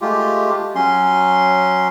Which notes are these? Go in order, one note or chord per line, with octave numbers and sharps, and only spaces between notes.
G#3 A3 F4 G4
F#3 C#4 C6